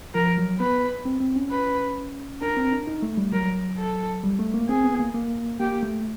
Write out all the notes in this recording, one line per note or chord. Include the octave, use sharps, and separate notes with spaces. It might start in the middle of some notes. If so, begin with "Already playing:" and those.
F3 A#4
F#3
B3 B4
C4
C4
C#4
B4
D4 A#4
C4
D4
D#4
A3
G3
F#3 A#4
A4
G3
A3
A#3
C4 G#4
B3
A#3
A#3
A#3 G4
A3